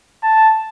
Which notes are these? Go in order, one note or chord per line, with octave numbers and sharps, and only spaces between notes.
A5